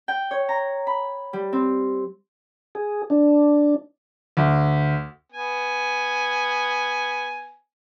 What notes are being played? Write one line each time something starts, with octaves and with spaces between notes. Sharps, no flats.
G5
C#5
A#5
B5
G3
C4
G#4
D4
D2
B3 G#5